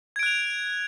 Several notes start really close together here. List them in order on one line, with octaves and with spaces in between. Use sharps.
G#6 D7 F#6 F7